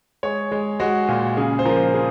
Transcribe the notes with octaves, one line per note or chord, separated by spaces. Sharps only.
G#3 C#5
G#3
G#3 F#4
A#2
C#3 G#4
C5
F3 A#4
C#3 G#4